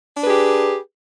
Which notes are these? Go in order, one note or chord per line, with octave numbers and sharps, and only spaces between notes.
D4 G4 G#4 B4